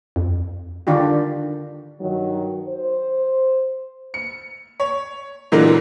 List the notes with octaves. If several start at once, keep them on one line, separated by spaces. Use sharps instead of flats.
F2
D3 D#3 D4 F4 G4
G2 D#3 F#3
C5
C#7
C#5
A#2 D3 E3 F#3 G#3 A#3